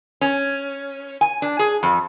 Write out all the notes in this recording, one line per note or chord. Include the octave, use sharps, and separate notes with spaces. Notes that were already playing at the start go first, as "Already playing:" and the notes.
C#4
G#5
D4
G#4
F2